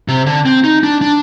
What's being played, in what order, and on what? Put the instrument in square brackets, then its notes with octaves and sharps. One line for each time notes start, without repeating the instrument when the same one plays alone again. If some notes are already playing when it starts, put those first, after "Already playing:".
[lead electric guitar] C3
D3
C4
D#4
D4
D4